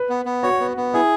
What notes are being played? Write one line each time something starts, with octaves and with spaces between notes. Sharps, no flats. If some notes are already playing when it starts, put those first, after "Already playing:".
Already playing: B4
B3
B3
F#4 C#5
B3
B3
E4 G#4